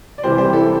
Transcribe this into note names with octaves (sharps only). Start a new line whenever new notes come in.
D5
C3 E3 G3 G4 C5
G4 C5
E4 A4